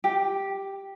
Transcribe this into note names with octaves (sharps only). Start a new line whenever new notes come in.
G4